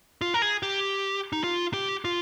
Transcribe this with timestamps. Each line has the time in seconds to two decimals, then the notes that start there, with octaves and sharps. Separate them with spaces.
0.21 F4
0.34 A#4
0.42 G#4
0.63 G4
1.33 D#4
1.44 F4
1.73 G4
2.05 F4